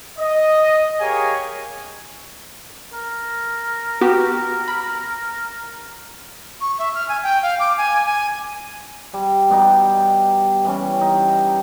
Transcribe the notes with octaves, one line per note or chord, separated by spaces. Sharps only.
D#5
G4 G#4 A#4 C#5 F5 G#5
A#4
B3 F#4 G4
B5
C#6
E5
F6
G#5
G5
F5
D6
G#5
G#5
G3
B2 G3 D#4 G4
E3 G3 C#4
D#4